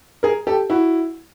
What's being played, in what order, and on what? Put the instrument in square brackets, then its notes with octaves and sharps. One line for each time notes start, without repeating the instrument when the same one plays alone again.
[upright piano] G#4 A#4
G4 A4
E4 F#4